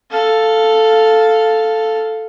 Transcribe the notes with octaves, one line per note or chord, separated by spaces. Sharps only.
A4 F5